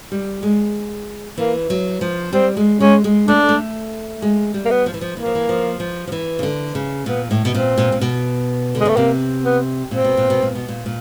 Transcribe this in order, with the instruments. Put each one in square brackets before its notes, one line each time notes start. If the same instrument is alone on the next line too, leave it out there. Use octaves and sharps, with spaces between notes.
[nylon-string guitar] G3
G#3
[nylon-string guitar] E3 [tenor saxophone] A#3
[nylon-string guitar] F#3
F3
[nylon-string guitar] G3 [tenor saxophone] C4
[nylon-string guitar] G#3
[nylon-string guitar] G#3 [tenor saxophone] C#4
[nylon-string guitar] G#3
[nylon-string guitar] A3 [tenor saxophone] D4
[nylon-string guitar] A3
G#3
G3
[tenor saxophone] A#3
B3
[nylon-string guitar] F3
E3
F3
[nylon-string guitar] E3 [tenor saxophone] A#3
[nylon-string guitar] F3
E3
F3
F3
F3
E3
C#3
D3
C#3
[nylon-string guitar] A#2 [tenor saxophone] B3
[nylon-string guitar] A2
B2
[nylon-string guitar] A#2 [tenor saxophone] C4
[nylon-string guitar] A#2
A#2
B2
D3
[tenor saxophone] G#3
[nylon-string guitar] C#3 [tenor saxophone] A3
[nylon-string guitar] C3 [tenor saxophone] A#3
[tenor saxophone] B3
[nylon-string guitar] A#2 [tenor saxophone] C4
[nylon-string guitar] B2
A#2
B2
A#2
B2
A#2
A#2